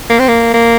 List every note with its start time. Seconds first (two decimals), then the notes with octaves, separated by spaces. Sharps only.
0.10 A#3
0.19 C4
0.28 A#3
0.54 A#3